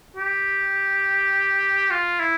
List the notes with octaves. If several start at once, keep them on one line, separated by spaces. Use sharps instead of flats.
G4
F4
E4